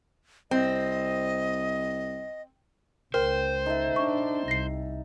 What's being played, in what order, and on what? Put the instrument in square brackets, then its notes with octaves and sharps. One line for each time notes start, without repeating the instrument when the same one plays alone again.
[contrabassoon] C2 [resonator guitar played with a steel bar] C4 [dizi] D#5
[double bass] C#2 [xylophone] A#4 [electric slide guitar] C5 [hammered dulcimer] G5
[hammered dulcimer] D#4 A4 E5
[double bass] D4 [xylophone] C#6
[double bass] C2 [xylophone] A#6 C7